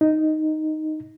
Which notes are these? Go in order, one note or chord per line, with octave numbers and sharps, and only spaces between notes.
D#4